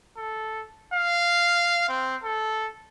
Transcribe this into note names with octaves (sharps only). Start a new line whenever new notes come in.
A4
F5
C4
A4